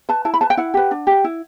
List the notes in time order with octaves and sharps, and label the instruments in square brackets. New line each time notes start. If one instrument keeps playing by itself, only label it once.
[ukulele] B4 A5
E4 A5
B5
B4 A5
G5
E4 F#5
G4 B4
D4
G4 B4
E4